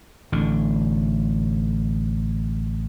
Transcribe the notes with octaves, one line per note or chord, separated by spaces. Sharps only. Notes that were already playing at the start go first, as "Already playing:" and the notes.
A1 D3